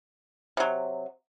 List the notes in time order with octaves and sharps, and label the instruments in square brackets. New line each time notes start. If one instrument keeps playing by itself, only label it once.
[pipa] C3 F#3